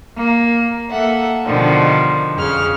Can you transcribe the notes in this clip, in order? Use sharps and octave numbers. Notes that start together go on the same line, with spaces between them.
A#3
A#3 A4 E5 F#5
B2 D3 D#3 F3 G3
F2 C#3 F6